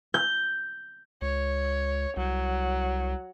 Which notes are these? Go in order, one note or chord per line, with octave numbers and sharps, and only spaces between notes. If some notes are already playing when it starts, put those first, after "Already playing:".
G6
C#2 C#5
C2 F#3